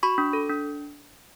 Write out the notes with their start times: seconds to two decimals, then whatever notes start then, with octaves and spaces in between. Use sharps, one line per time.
0.03 F#4 B5 C#6
0.18 D4
0.33 A4
0.49 D4